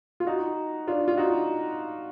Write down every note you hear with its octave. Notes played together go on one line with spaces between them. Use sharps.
F4
D#4 F#4
D4 F4
F4
D#4 F#4